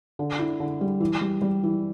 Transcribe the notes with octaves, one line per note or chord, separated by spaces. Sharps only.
D3
E4
D3
G3
E3
G3
G3
E3